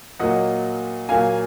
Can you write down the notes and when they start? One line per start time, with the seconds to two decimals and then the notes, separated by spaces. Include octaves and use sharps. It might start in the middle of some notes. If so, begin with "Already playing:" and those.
0.19 A#2 F#3 A#3 D#5 F#5
1.09 A#2 F#3 A#3 F5 G#5